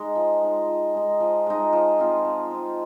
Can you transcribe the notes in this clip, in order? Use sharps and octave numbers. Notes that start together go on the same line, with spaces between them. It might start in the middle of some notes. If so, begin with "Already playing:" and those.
Already playing: G#3 D#4
F3
G#3 D#4
F3
G#3 D#4
F3
G#3 D#4
F3
C4 F4
F3
C4 F4